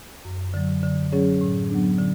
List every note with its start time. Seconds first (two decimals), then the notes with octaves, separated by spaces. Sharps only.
0.25 F#2
0.54 D3 F#3
0.83 D3
1.12 F#3 C#4 G#4 C#5
1.41 A2
1.70 F#3 B3 D4
1.99 D3